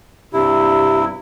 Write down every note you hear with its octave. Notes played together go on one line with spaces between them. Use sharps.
G2 C3 E4 G4